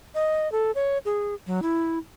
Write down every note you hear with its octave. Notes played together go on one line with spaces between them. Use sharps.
D#5
A4
C#5
G#4
F#3
E4